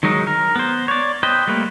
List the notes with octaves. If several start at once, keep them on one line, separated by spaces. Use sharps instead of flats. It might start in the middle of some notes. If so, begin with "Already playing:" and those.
D#3 F#3 G#3 D#4
A#4
B3 C5
C#5 D5
B4 C5 D#5 G5
G3 A3 A#3 B4